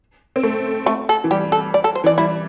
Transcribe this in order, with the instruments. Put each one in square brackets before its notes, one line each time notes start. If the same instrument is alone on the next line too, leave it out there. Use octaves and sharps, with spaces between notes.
[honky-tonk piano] C4
A3
[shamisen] A3
A4
[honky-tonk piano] E3
[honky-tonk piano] G3 [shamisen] G4
[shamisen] A4
D5
A4
C5
[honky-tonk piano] E3 [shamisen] D5
[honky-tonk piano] G3 [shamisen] E4